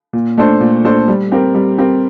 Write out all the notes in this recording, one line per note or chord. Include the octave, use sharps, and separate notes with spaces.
A#2
A3 D4 A4 C5
A#2
A3 D4 A4 C5
G3
C4 G4 A#4
G3
C4 G4 A#4